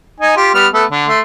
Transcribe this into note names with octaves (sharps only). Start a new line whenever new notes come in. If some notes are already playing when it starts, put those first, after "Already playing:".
D#4 G#5
F4 G4
G3 B3 F6
A3 B3 A4
D3
A3 C6